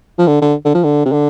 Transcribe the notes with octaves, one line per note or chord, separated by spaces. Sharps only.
F3
D3
D3
D3
F3
D3
C3
D3